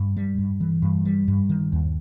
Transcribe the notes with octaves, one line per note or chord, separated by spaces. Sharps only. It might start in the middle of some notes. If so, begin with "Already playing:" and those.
Already playing: G2
G3
G2
E3
G2
G3
G2
D#3
D#2